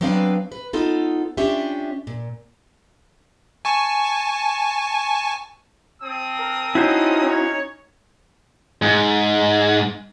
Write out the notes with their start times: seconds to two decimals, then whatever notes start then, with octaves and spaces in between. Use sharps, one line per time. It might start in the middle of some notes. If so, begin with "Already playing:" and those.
0.01 F#3 B3 C4 D4 B4 F5
0.52 B4
0.73 B3 D#4 F4 A4
1.37 C#4 D4 F4 G4 E5
2.07 A#2
3.65 G#5 A5 C#6
6.03 C4 A5 D#6
6.38 A#4
6.75 C#4 D#4 E4 F#4 C5
7.28 C#5
8.82 G#2